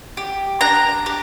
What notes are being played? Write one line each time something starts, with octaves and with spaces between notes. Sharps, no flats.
G4
D4 A#5
G4